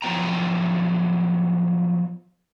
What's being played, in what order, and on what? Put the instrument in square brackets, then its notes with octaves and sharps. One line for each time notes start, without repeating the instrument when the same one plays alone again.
[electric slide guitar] F3 F#3 B3 G5 A#5